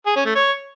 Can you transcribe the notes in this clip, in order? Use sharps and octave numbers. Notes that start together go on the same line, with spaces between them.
G#4
C#4
A3
C#5